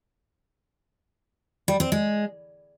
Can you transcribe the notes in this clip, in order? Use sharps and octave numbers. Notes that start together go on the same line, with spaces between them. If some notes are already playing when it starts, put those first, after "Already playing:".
G3
C4
G#3